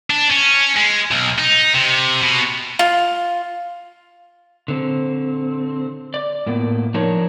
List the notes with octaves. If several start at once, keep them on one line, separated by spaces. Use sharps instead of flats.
D4
C#4
G#3
B1
D#4
C3
B2
F4
D3 C4
D5
A2 A#3 B3
F3 D4 D#4 A#4 C#5